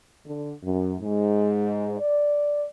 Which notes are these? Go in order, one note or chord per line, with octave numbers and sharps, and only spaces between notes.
D3
F#2
G#2
D5